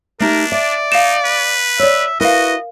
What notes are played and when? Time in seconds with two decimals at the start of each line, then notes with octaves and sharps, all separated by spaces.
0.20 A3 D4 D#4 G4 A#4
0.52 D5 E5
0.92 D#4 F5 E7
1.25 B4
1.79 C#5 D5 E5
2.20 E4 F#4 A#4 B4 D#5 F5